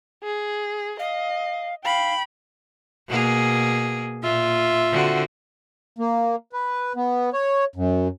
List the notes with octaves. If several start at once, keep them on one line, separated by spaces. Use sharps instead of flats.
G#4
D#5 F5
F5 G5 B5
B2 A#3 G#4
A#2 F4 E5
D3 C4 F#4
A#3
B4
B3
C#5
F#2